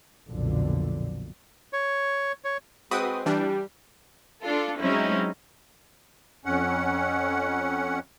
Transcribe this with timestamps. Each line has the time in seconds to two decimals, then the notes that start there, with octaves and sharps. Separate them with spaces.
0.29 B1 F2 A#2 D3
1.73 C#5
2.44 C#5
2.91 G#3 C4 F#4 B4 D#6
3.26 E3 G3 D4
4.43 D4 F4 A4
4.81 F#3 G#3 C4 C#4 D#4 E4
6.45 F2 C#4 F#5